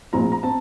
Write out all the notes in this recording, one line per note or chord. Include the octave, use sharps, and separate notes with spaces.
A#1 A2 F3 C4 A#5
A#5
C4 A5